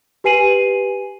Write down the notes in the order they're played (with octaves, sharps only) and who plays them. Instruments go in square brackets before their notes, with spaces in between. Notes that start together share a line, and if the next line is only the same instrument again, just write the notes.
[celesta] G4 B4 G#5 C7 D#7 F#7